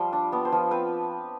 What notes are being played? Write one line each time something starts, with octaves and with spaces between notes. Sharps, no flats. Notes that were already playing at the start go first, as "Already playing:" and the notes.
Already playing: F3 G3 F4 A5 C6
D4
B3 D5
C5
F3
C4 B4